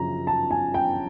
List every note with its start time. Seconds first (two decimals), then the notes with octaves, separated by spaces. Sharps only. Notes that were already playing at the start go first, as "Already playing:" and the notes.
Already playing: F#2 C#3 F3 A#5
0.27 A5
0.51 G#5
0.74 G5